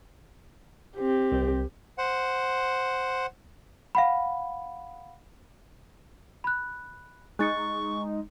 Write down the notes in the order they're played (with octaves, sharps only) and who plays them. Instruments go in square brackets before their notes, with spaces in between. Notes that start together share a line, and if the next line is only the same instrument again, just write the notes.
[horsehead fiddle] C4 G4
[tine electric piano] C2
[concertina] C5 F#5
[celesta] F5 F#5 B5
B5 F#6
[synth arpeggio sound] G#3 D#4 [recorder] C#6 [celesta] F#6 A6 C#7